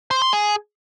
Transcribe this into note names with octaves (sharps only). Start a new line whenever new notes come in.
C5
C6
G#4